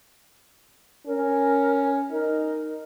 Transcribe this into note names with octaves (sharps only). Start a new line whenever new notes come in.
C#4 A#4
D#4 A#4